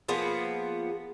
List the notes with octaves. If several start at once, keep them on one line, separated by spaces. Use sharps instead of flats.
F3 A#3 B3 G#4